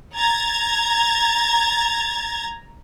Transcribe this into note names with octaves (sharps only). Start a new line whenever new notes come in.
A#5 G#6 A6